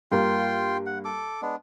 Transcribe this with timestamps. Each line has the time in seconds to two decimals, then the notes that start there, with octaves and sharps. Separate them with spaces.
0.12 G2 A#3 F4 G5 C6
0.86 F#5
1.05 A4 D6
1.42 G#3 B3 D4